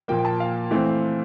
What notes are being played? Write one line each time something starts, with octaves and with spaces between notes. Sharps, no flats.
A#2 F3 A#3 G5
G5
A5
F5
E3 A3 C4